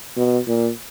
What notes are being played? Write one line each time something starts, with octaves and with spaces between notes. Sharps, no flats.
B2
A#2